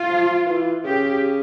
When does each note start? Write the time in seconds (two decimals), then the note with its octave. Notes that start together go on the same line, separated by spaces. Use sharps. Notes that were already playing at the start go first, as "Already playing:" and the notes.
Already playing: F4
0.09 F3
0.47 E3
0.84 C#3 G4